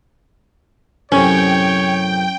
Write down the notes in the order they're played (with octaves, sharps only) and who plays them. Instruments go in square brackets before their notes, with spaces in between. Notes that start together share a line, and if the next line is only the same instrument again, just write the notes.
[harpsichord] F#2 A2 C3 [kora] C#4 [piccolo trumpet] C#5 [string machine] G5